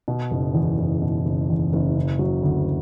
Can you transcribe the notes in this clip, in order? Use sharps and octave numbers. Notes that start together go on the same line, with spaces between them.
B2
F#1
E2
F#1
B2
F#1
E2
F#1
C#3
F#3
D2